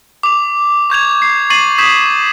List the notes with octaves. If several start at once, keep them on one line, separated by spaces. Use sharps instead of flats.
D6 F7
C#6 G6 G#6 F7
C7
C#6 A6 C7 D#7 F#7
C#6 D#6 G6 G#6 B6 E7